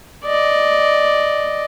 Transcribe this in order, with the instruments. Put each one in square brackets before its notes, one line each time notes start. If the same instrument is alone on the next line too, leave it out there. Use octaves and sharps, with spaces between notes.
[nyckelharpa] D5 D#5